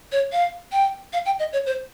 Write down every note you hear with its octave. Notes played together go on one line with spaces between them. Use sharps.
C#5
F5
G5
F5
G5
D#5
C#5
C5